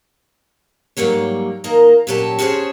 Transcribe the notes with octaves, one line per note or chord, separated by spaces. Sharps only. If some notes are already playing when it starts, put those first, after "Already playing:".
G#2 F#3 G3 A#3 C#5
D#3 A#3 D#5 A#5
A#2 F#3 C#4 G4 A5
C#4 F#4 G#4 A#4 C5 C#5